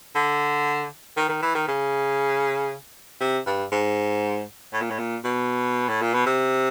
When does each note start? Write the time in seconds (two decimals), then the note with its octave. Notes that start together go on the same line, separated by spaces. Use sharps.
0.15 D3
1.17 D#3
1.29 D#3
1.42 E3
1.55 D#3
1.68 C#3
3.21 C3
3.46 G2
3.72 G#2
4.73 A2
4.82 A#2
4.90 A2
4.99 A#2
5.25 B2
5.89 A2
6.02 A#2
6.14 B2
6.26 C3